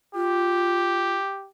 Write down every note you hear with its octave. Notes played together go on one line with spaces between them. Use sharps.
F4 G4